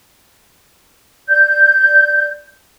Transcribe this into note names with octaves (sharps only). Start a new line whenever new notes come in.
D5 G6